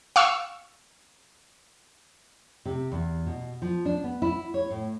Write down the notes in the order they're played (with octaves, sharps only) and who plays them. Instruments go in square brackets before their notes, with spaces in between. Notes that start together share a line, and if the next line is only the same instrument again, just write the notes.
[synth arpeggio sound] F5 C#6 E6
[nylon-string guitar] C3
E2
B2
F3
D4
B3
E4
C#5
A2